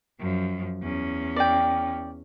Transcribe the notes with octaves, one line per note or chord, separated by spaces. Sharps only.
F#2 F3
E2 C#4
D5 G5